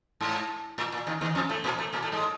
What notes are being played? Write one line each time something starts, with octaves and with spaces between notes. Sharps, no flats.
G#2
A2
A#2
D#2 D#3
D#2 D#3
F2 F3
A2 A3
A#2 A#3
A2 A3
A#2 A#3
A2 A3
G#2 G#3